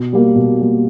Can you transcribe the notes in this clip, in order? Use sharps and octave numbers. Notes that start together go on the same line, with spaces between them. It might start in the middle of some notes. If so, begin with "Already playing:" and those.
Already playing: B2
G3 A#3
B2
G3 A#3